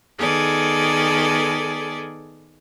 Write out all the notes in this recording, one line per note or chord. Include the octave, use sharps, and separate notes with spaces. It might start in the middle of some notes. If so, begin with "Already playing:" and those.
D#3 B3 G#4 A4 D5